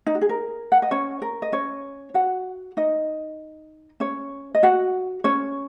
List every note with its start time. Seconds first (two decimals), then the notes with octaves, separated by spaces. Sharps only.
0.06 D#4
0.15 F#4
0.21 G#4
0.29 A#4
0.72 F#5
0.82 D#5
0.91 C#4 C#5
1.22 A#4
1.42 D#5
1.52 C#4 C#5
2.14 F#4 F#5
2.77 D#4 D#5
4.00 C#4 C#5
4.55 D#5
4.63 F#4 F#5
5.24 C#4 C#5